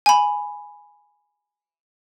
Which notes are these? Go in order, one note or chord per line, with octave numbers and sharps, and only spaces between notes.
G#5 B5